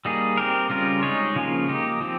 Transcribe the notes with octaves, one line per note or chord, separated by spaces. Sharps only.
G3 A#3 D#4 G#4
C4 G4 A#4
C#3 G3 C4 F4 A#4
G#3 D#4 G#4 C#5
C#3 F3 A#3 F4
A#3 D#4 G4
F3 C4 G4